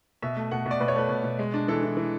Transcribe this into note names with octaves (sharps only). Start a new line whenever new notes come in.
B2 E5
A3
B2 F#5
B2
D5
B2 B4
C#5
A3 B4
B2
B2
G#3
D4
E3 A4
E3
E3